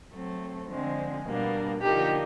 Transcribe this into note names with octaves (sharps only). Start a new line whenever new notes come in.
F#3 A3 C4
D3 F3 G#3 C4
B2 G3 A#3 D4
D3 F3 A#3 D#4 G4